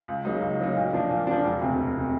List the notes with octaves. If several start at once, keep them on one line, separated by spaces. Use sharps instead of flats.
C#2
C#3 F#3 A#3 D#4
C#2
C#3 F#3 A#3 D#4
A#2
F3 A#3 D4
A#2
F3 A#3 D4
E1
D2 C3
E1
C3